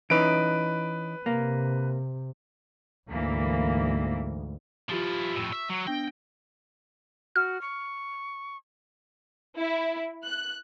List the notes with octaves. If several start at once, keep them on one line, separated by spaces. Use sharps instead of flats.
E3 C#4 D#4 B4 D7
C3 A#3
D2 G#2 E3 A#3
F3 E4 F4 G4 A6
F2 A2 C#6 E6
E5
F#3
B3 D4 G5 A#6
F#4 F6
C#6
E4
F#6